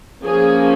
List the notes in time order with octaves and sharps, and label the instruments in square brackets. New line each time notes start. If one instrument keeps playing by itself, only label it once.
[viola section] F3 A#3 C#4 G#4